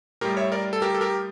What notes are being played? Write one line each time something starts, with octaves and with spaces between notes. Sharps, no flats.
A2 G3 G4 A#4
C#5 E5
A#4 D5
A4
G4 A#4
A4
G4 A#4